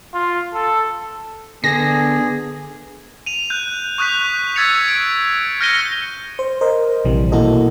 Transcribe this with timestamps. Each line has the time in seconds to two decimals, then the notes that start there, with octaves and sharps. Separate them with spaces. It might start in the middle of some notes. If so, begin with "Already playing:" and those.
0.14 F4
0.54 A4
1.64 D3 B3 G#4 A#6
3.26 D#7 F7
3.50 F#6 G6
3.98 C#6 D#6 F#6 G6 B6 F7
4.56 E6 G#6 A6 B6 C#7 F7
4.88 D7
5.61 F6 G6 A#6 C#7 D#7 G7
6.39 C5
6.61 A#4 C5 D#5
7.05 A#1 C3 E3 G3
7.32 B2 A#3 E4 F#4 A4 D#5